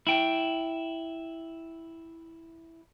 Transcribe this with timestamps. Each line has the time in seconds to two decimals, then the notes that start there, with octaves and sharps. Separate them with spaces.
0.07 E4 G5